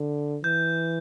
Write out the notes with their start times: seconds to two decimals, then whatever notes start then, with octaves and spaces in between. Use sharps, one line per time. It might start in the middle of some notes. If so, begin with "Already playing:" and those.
Already playing: D3
0.44 E3 G6